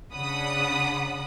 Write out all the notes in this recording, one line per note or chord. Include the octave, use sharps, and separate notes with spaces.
C#3 D4 F#5 B5 D#6